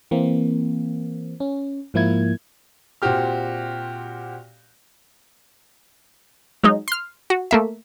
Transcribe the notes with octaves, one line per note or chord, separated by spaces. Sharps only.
E3 A#3 C4
C#4
G#2 F3 A#3 E4 G#6
A#2 C4 F#4 G4 F6
F#3 G#3 D#4
C6 F6
F#4
A3 A#3 E5